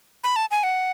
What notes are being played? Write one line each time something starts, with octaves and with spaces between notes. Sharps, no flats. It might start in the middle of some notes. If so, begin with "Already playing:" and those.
B5
A5
G#5
F#5